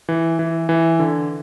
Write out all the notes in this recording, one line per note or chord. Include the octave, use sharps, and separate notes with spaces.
E3
E3
E3
D3